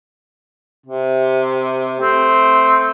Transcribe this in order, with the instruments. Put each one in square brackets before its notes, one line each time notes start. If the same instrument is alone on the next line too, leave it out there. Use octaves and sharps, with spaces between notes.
[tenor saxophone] C3
[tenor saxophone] A3 [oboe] C4